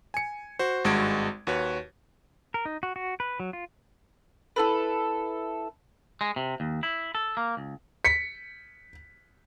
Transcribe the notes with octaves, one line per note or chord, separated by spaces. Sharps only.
G#5 C#7
F#4 C5
G#1 G2 G#3 F#4 G#6 D7
D#2 F#4 B4 C#5
A#4
D#4
F#4
F#4
B4
F#3
F4
E4 A4 B4
G#3
C3
D#2
E4
A4
A#3
C#2
B6 C#7